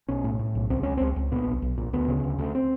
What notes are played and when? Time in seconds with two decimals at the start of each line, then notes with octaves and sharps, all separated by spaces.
0.08 B1 C#4
0.24 A2
0.39 A2
0.55 B1
0.70 C#2 C4
0.83 C#2 C#4
0.97 C#2 C4
1.16 C#2
1.32 A#2 B3
1.47 B1
1.62 B1
1.78 A#2
1.93 D2 B3
2.08 C#3
2.24 D2
2.39 D2
2.55 C4